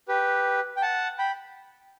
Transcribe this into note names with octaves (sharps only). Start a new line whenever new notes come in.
G4 B4
G5
F#5 A5
G5 B5